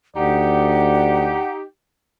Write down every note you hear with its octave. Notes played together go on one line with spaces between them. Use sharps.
D2 D#4 G4 D5 F#5